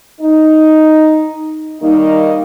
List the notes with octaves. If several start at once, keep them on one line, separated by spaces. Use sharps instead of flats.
D#4
D#3 G3 A#3 D#4